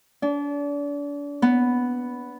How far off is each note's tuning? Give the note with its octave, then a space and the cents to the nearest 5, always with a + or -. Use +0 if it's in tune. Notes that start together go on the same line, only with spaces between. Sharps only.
D4 -35
B3 +0